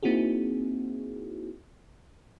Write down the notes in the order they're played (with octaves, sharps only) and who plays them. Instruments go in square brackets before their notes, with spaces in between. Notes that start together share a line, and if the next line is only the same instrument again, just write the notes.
[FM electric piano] A#3 C4 D#4 E4 F#4 G#4